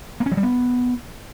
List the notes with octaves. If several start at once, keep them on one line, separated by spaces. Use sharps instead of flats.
A#3
C#4
F#3
G3
B3